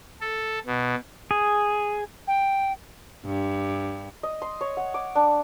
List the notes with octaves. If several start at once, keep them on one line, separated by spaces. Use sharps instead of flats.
A4
B2
G#4
G5
G2
D#5
C6
C#5
F#5
D6
D4